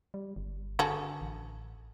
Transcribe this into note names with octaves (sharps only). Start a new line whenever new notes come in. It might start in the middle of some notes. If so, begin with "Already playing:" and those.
G3
G1
D3 F#4 G#4 A4
A1